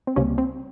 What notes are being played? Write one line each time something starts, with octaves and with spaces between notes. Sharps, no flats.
C4
C#2 C3 G3 A#3 C#4
C4